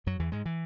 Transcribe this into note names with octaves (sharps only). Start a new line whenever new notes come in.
F#2 F#3
E2 E3
G#2 G#3
E3